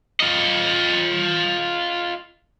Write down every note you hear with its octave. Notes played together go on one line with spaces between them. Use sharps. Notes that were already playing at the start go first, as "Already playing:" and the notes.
F4 D#5